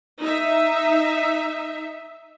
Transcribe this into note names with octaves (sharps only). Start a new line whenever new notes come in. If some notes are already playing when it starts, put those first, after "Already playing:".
D#4 E5